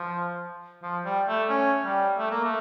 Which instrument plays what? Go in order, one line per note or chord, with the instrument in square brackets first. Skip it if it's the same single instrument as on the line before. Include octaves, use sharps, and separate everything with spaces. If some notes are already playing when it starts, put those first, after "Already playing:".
Already playing: [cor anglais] F3
F3
G3
A3
C#4
G3
A3
A#3
A3